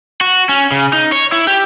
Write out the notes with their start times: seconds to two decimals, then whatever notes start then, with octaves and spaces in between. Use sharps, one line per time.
0.21 F#4
0.49 C#4
0.71 C#3
0.93 D#4
1.12 C#5
1.32 E4
1.47 G4